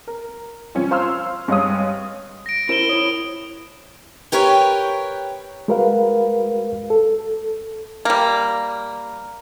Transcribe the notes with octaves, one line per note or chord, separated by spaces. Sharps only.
A#4
F3 C#4 F4
C5 F5 C6 E6 F6
G2 G#3 C#5 F5 D#6
A#6 D7
E4 A#4 C5 D7 E7 G7
E4 C#5 D#6
G4 A#4 B4 C#5 F5 G5
G#3 F#4 A#4 B4 F5
A4
G3 A#3